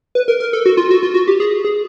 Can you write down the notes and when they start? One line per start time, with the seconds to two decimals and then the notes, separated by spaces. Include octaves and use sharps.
0.15 B4
0.28 A#4
0.40 A#4
0.53 A4
0.66 F#4
0.77 F4
0.91 F#4
1.03 F4
1.14 F#4
1.27 G4
1.40 G#4
1.65 G#4